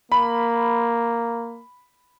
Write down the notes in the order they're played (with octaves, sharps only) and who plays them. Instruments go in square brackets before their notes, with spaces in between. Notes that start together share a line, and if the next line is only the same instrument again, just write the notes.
[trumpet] A#3 [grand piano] B5